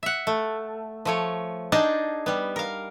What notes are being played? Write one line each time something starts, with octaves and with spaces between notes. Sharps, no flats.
E5 F#5
A3
F3 A3 C#5
D4 D#4 G#4 D#5 G5 A5
G3 B3
A#4 F5